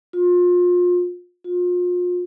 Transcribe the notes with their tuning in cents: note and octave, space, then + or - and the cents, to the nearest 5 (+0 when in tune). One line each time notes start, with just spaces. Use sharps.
F4 +30
F4 +35